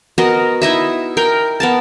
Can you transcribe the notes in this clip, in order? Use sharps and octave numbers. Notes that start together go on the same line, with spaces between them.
B3 F#4 A#4 D#5
D#4 E4 D#5 E5
A#4 G5
B3 A#4 A5